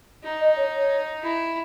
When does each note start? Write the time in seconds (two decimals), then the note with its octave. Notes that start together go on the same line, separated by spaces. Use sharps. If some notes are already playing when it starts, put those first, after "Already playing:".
0.24 D#4
0.40 D#5
0.56 C#5
0.73 C#5
1.23 E4